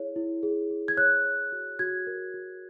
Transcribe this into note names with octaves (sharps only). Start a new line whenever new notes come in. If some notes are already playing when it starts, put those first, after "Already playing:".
Already playing: E4 G#4 C#5
E4
G#4
G#4
G#6
C#5 F#6
C#5
F#4
F#4 G#6
A#4
F#4